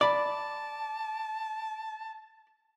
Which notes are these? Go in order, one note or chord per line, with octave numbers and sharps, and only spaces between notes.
D5 A5 B5 D6